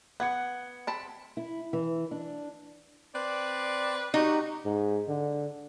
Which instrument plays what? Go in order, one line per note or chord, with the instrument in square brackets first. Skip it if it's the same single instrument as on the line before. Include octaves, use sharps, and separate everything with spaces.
[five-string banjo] B3 [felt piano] F#5 G#6 C#7
[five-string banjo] C4 A5 B5
[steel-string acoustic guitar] E4
E3
D4
[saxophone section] C4 B4 D5
[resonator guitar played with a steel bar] D#4 [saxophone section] F#4 G4
[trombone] G#2
D3